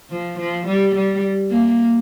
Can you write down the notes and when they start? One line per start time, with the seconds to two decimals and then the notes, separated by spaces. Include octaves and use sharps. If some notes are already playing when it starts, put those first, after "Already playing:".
0.10 F3
0.39 F3
0.67 G3
0.96 G3
1.51 A#3